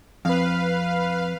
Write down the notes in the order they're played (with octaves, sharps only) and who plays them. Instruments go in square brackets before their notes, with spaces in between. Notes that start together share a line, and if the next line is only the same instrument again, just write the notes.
[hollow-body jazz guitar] F2 [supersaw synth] B4 F5